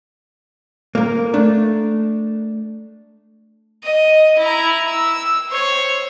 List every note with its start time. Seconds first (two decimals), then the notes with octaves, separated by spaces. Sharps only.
0.95 A#3 A#4
1.34 A3 D4
3.84 D#5
4.38 E4 A#5
4.87 E6
5.50 C5 C#5